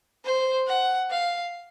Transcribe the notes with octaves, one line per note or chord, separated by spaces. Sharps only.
C5
F#5
F5